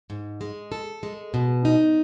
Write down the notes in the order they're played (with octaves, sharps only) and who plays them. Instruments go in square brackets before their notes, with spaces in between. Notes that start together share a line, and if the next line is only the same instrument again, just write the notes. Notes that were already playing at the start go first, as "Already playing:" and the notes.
[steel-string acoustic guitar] G#2
G#3
A4
G#3
B2
D#4